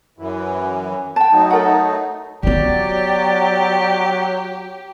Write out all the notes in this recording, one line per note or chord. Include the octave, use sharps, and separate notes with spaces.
F#2 E3
G5 A5
F#3 A3 D#4
A4 A#4 F#5
F#3 B3 F4 G4 D5